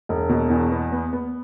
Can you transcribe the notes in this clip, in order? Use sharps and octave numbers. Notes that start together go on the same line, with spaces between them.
E1
B2
E2
B3
B3
B3